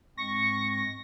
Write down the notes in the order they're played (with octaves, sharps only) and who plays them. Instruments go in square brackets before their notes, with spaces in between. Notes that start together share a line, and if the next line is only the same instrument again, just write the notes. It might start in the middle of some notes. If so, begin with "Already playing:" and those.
[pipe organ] G#2 G#3 C4 [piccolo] C#6 [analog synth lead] A#6